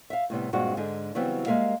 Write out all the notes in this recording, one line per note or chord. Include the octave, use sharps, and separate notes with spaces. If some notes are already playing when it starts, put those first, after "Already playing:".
E5 F5
A2 C3 G3 B3
G2 A#2 G#3 C4 F#4
G#2 D3 G#4
C#3 E3 F#3 G3 B3 C4
G3 G#3 A#3 A#4 E5 F5